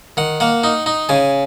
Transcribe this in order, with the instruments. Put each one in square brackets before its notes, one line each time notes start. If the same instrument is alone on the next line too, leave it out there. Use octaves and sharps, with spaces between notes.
[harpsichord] D#3 F#5
A#3 F#5
D#4
D#4
C#3 G#5